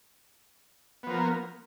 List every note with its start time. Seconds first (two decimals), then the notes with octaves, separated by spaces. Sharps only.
1.03 B3
1.07 F3
1.10 A#4
1.14 A#3